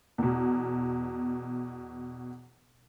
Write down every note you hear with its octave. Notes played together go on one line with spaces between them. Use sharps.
E2 B2